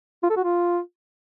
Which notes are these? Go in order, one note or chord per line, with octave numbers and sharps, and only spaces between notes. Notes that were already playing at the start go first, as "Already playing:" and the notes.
F4
A4
F#4
F4